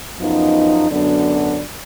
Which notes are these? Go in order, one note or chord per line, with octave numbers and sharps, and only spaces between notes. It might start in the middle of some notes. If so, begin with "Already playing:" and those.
F#2 F3 B3 D#4
F#2 D3 F#3 B3 D4